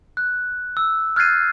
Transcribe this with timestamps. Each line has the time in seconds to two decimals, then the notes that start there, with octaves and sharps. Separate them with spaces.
0.17 F#6
0.77 E6
1.16 F6 F#6 G#6 A6 C7 D#7